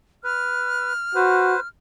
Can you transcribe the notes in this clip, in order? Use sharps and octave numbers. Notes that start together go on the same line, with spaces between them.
B4 F6
F#4 B4 C5